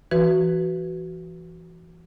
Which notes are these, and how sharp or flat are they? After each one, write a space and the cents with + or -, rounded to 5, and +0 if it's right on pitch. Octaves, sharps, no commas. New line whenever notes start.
E3 +25 F#4 +10 B4 +0